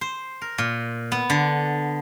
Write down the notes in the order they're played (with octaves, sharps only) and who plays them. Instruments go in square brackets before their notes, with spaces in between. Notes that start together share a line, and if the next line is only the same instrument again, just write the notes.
[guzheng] C5
A#4
A#2
B3
D3